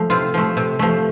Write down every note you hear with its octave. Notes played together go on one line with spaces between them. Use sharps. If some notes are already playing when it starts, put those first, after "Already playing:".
Already playing: F3 A3
C3 F4
F3 A3
C3
F3 A3